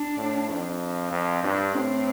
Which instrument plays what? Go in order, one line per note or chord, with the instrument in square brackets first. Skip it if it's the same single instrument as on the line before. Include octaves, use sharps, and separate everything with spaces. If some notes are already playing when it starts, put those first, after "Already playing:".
Already playing: [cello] D4
[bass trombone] A2
F2
F2
[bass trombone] G2 [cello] D4
[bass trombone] A2 [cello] C4